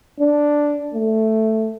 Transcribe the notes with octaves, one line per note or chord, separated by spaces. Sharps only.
D4
A3